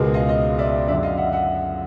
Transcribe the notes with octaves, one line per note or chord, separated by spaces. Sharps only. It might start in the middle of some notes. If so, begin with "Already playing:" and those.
Already playing: C#2 B2 G#3 B3 G#4 A#4
D#5 F5
D#5 F5
D5 E5
F#2 D3 F#3 D5 E5
D#5 F5
E5 F#5
E5 F#5